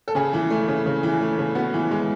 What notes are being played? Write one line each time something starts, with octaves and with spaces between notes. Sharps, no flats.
A4
C#3 G#4
E3
A3
C#3
C#3
E3
A3
C#3
B3 F#4
E3
G#3